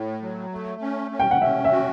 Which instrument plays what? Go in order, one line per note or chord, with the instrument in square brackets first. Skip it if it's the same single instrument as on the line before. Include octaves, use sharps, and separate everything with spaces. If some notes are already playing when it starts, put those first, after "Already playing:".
Already playing: [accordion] A2
F#3
A3
C#4
C#4
[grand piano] G5
F#5
[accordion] C#4 [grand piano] E5
[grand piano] E5
[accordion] F#4